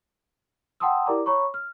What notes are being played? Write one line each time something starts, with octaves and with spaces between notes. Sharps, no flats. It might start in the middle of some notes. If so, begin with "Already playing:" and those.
F#5 G5 A5 C6 D#6 E6
E4 G4 A#4 D5 A#5 D6
C#5 A#5 B5 C#6
F6